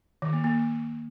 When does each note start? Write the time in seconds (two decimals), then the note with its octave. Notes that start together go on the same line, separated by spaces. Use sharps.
0.22 D#3
0.33 A#3
0.44 A#3